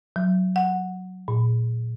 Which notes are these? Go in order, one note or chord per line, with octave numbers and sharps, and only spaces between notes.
F#3
F#5
A#2